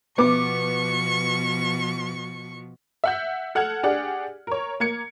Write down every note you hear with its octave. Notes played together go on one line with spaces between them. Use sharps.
B2 F3 B3 C#6 D6
E5 F#5 G6
A4 F#5 F6 G#6
D4 G4 G#4 D5 F#5
A#4 C#5
A#3 G#6 C#7